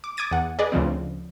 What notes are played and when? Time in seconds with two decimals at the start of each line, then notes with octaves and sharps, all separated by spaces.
0.04 D6
0.17 D6 D#6 G#6 A6 D#7
0.31 E2 F#5
0.59 G#4 B4 D5 D#5
0.72 D2 C#3 F3 C4